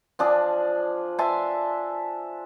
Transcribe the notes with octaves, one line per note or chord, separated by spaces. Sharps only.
F3 D4 G#4
E5 G#5 A5 C6